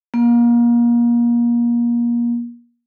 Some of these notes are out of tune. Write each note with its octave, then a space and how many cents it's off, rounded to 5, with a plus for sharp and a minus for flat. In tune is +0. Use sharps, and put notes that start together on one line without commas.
A#3 +30